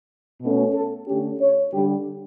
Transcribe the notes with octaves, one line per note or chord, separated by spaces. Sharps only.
B2 A3 C#4
A4
D3 A3 C#4 G4
C#5
D3 G3 D4 G4